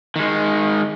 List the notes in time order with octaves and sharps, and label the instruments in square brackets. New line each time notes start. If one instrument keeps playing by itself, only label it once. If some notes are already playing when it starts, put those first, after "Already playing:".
[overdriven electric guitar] D#3 G#3